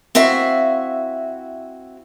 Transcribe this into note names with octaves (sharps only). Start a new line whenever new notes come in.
C4 E4 F#4 E5 F5